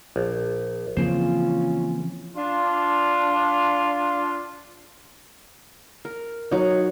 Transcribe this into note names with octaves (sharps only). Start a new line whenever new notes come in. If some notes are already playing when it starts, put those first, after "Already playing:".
A#1
C#3 E3 F3 A#3 C4 C#4 F4 C5
D4 F4
A#4
F#3 D#4